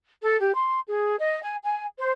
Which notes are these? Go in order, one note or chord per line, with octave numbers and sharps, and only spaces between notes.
A4
G4
C6
G#4
D#5
G#5
G#5
C5